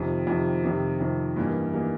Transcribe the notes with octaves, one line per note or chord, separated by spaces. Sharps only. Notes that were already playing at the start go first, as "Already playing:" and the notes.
Already playing: F2 C3 D#3
F2 C3 D#3
F2 C3 D#3
F2 C3 D#3
G2 E3 G3 A#3 D#4
E3 G3 A#3 D#4